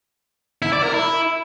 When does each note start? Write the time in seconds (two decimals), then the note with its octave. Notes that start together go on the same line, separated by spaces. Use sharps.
0.62 E4
0.73 D5
0.83 A#4
0.94 E4